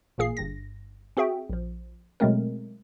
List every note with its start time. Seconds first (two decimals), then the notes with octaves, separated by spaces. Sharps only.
0.18 A1 A#2 A#3 G#4 C7
0.37 G1 G2 A#6
1.17 C4 F#4 G#4 E5 G5
1.50 A#1 F3
2.20 B2 F#3 G#3 A3 C4 A#4